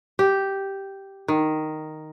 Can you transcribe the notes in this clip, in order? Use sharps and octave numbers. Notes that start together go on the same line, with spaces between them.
G4
D#3